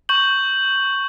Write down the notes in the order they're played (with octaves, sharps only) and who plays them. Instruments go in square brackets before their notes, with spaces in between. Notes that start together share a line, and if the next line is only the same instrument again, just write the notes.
[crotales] C#6 G6 F#7